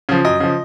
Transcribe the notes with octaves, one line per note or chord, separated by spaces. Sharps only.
C#3 F3
F#2 D#5
C#3 F3